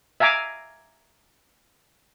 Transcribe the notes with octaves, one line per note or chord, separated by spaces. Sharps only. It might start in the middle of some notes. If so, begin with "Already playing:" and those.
E5 F5 G#5 A#5 D6